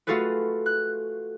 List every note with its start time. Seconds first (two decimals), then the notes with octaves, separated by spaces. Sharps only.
0.07 A3 F4 F#4 G#4 A4 B4
0.66 F#6